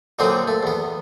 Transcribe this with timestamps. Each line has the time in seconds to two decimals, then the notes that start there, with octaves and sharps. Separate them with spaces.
0.19 A#2 D3 F#3 C4 D#4
0.48 A3
0.63 E2 B3